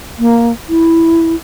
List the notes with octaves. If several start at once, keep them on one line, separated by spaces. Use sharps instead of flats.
A#3
E4